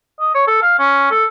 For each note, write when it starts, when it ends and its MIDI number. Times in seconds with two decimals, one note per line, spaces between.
0.20 0.34 75
0.34 0.44 73
0.47 0.62 69
0.62 0.77 77
0.79 1.06 61
1.11 1.25 69